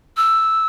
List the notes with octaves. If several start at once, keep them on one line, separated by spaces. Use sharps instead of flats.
E6